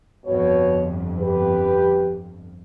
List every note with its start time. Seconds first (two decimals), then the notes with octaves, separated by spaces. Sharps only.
0.25 G1 F2 B2 C#5
1.19 G4 B4